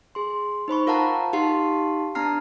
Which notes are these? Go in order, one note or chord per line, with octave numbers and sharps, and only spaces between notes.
G#4 C6
D#4 C5 B5 C#6
F4 A#4 F5 F#5 A5 A#5
D#4 G4 F5 A5 C6 C7
B3 D4 A5 A#5 F6 C7